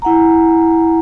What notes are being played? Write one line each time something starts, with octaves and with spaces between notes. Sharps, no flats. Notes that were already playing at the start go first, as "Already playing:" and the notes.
E4 F#5 G#5 A#5